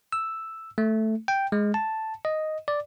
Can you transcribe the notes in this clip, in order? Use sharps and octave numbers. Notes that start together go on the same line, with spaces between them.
E6
A3
G5
G#3
A5
D#5
D5